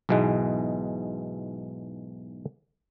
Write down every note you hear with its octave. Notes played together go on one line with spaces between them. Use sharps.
B1 G#2 B2 E3 G#3